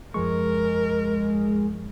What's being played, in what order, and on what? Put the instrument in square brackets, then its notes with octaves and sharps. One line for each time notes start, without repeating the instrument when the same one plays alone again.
[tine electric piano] F#2 F3 C#6 [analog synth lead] G#3 [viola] A#4